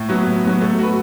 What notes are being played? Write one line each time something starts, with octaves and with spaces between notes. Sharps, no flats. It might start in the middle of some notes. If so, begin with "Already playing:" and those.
Already playing: A2
F#3 B3
A2
F#3 B3
A3
F#4 B4